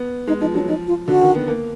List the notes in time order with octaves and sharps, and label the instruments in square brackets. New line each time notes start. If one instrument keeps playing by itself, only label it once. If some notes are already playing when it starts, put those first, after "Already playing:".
Already playing: [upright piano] B3
[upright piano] G#3 [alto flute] D#4
[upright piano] F3 [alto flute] D#4
[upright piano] F#3 [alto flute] D4
[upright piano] F3 [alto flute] D#4
[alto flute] F4
[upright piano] D3 [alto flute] F#4
[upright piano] D#3
B3
A#3